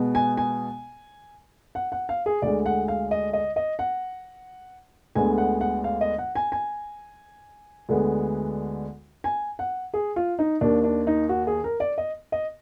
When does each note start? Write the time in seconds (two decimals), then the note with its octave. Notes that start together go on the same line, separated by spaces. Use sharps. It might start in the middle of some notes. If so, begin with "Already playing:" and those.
Already playing: B2 G#3 B3
0.15 G#5
0.37 G#5
1.75 F#5
1.92 F#5
2.09 F5
2.26 G#4
2.42 D2 D3 G#3 D5
2.66 F#5
2.88 F5
3.11 D#5
3.33 D#5
3.56 D#5
3.79 F#5
5.15 D2 D3 G#3 B3 G#5
5.38 F#5
5.61 F#5
5.84 F5
6.01 D#5
6.18 F#5
6.35 G#5
6.52 G#5
7.89 D2 D3 G#3 B3
9.24 G#5
9.59 F#5
9.94 G#4
10.16 F4
10.39 D#4
10.61 D#2 D#3 A#3 D4
10.84 D4
11.07 D#4
11.29 F#4
11.47 G#4
11.64 A#4
11.80 D5
11.98 D#5
12.32 D#5